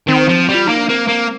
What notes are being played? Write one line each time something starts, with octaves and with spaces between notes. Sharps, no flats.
D#3 C4
F3
G3
F4
A#3 D#4
D4
A#3 C4
A#3